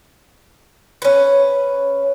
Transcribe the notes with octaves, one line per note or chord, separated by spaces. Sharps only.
C#4 B4